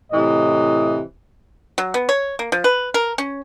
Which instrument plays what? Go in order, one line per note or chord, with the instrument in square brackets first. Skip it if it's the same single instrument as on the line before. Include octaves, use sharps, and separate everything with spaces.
[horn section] A2 C3 E3 D#5
[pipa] F#3
B3
C#5
A#3
F3
B4
A#4
C#4